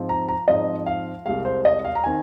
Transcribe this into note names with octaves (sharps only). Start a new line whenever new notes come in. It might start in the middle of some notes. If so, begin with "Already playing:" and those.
Already playing: G#2 F3 C4
A#5
A#5
G#2 F3 C4 D#5
F5
C2 C3 G#3 F5
C5
D#5
F5
A#5
D#3 C4 G#5